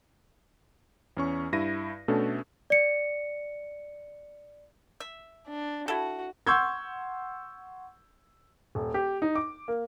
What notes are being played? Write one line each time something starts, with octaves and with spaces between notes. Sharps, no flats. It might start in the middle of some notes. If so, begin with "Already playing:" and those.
E2 C#4 C#6
G2 E4 A#6 D#7
B2 A3 C#4 D4 A4
D5 C#7
E5
D4
E4 F#4 A4
F#5 C6 C#6 E6 G6 G#6
D#1
G4
D#4
D6
A#3